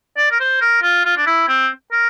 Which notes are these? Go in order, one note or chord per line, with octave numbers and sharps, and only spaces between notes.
D5
A#4
C5
A#4
F4
F4
D4
E4
C4
A#4